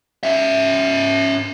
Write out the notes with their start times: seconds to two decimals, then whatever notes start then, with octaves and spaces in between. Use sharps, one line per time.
0.23 C#4 E5